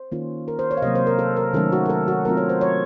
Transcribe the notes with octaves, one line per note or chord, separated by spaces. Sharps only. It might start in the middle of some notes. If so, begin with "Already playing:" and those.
Already playing: C5
D#3 A#3 C#4 F4
A#4
C5
C#5
F5
C3 F#3 A#3 D#5
C5
A#4
A4
A#4
D#3 F#3 A3 C#4 A4
F#4
A#4
A4
F#4
F#3 A3 C4 F4 A#4
C#5
C5
C#5